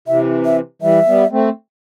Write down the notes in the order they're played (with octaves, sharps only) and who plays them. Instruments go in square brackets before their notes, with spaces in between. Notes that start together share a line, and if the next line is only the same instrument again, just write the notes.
[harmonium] C3 E3 [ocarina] E5
[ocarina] E5
[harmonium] E3 G3 [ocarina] E5
[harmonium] G3 B3
A3 C4